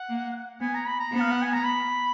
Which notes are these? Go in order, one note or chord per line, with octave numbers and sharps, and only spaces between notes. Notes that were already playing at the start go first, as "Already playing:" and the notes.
Already playing: F#5
A#3
B3 G#5
A#5
B5
A#5
B3
F5
F#5
G#5
A#5
B5